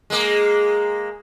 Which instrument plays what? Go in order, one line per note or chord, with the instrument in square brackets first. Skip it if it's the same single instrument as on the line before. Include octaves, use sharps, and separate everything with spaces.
[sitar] G#3 A#3